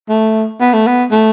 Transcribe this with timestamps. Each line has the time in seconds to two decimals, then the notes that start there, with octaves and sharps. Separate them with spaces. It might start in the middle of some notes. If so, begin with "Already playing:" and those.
0.09 A3
0.61 B3
0.74 A3
0.87 B3
1.11 A3